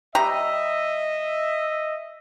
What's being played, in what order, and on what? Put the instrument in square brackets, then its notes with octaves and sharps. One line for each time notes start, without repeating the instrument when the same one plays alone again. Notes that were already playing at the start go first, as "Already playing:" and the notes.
[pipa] G3 G4 A#5 [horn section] D#5 E5